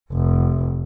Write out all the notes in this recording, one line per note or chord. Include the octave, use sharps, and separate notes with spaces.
F1